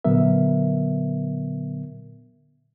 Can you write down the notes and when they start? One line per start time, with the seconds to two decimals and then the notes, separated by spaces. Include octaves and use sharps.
0.05 A#2 D3 F#3 B3 A#4 E5